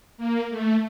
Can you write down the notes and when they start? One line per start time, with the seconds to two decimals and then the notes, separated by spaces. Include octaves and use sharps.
0.18 A#3
0.50 A3